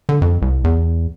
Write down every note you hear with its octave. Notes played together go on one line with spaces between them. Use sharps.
D3
F2
C2
E2